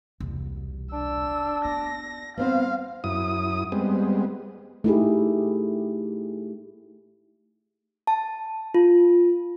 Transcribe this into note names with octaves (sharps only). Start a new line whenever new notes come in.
E1 C2
D4 E6
B3 A#6
G3 B3 C4 C5 F5
F#2 E4 D#6
G3 G#3 B3 C4
A3 D#4 E4 G4 G#4
A5
F4